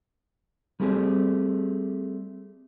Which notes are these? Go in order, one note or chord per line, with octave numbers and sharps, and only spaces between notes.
G3 A3 C4 G4 G#4